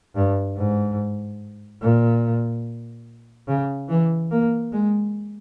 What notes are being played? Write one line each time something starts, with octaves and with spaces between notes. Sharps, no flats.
G2
G#2
A#2
C#3
E3
A#3
G#3